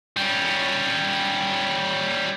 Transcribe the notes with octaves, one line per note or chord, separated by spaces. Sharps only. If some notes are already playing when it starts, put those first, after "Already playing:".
G3 C#4